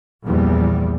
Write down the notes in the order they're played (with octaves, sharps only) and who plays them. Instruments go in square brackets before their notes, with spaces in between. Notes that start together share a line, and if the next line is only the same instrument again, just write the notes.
[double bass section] A#1 E2 G3